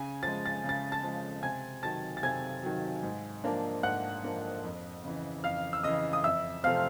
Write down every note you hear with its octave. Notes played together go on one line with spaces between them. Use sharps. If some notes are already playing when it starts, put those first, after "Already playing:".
Already playing: C#3 G#5
F3 G#3 A6
A6
C#3
A6
A5 A6
F3 G#3
C3 G#5 G#6
D#3 F#3 A5 A6
A6
C3 G#5 G#6
D#3 F#3
G#2
F3 A#3 D4
G#2 F#5 F#6
F3 A#3 D4
F2
C#3 E3
F2 F5 F6
E6
C#3 E3 D#5 D#6
D#6
F2 E5 E6
C3 F3 A3 C4 F5 F6